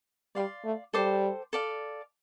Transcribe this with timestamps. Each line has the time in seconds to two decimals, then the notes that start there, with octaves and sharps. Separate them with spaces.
0.35 G3 D5 F5 C6
0.65 A3
0.94 G3 A4 C5 G5 D6
1.53 A4 D5 F5